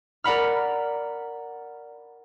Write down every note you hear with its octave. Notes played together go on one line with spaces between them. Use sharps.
A#4 D5 F#5 B5 F6